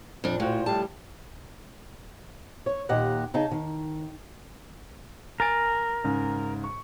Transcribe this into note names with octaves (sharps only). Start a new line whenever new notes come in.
F2 A#2 D4
A2 F4 F#4 C5
A2 F3 G3 A5
C#5
D#2 A#2 G4 D#5 F#5
C#3 D#4 G#4 A5
D#3
A#4 G#5 A6 D7
G#2 C#3
C#6